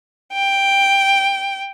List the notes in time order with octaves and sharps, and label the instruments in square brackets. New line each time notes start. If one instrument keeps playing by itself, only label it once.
[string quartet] G5